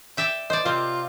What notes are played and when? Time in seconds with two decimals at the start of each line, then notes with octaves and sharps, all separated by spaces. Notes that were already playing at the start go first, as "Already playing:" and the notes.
0.17 D5 E5 G5
0.50 C5 D5 D#5
0.65 C3 C4 F4